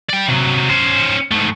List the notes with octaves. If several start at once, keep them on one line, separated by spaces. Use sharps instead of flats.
D5 G5
C3 F#3
C#4 C5
G#2 A3